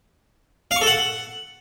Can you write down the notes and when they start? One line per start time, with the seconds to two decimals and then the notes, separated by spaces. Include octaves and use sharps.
0.71 F5
0.76 C#6
0.81 A4
0.87 F#5